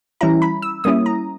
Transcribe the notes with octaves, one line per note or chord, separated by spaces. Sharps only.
E3 G3 C#4 E4 A#5
B5
E6
G3 A#3 C#4 E4 D#6
A#5